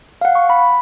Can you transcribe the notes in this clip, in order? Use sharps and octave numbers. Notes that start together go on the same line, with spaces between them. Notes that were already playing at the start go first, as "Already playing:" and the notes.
F5 F#5
C#6
B5